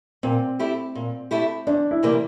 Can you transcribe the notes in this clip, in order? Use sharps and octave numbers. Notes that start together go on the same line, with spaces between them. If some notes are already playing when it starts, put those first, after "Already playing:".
A#2 C4
A3 E4 G4
A#2
A3 E4 G4
E2 D4
E4
C3 E3 G3 A#3